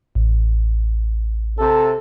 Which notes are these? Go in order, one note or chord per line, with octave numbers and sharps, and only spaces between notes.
A1
C3 A4